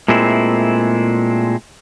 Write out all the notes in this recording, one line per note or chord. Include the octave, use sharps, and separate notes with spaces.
A#2 G#3 A3 C4 E4